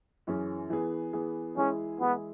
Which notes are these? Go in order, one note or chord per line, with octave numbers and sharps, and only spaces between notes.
F#2 E3 C#4 G#4
E3 B3 G#4
E3 B3 G#4
E3 G#3 C#4 E4 G#4
E3 G#3 B3 E4 G#4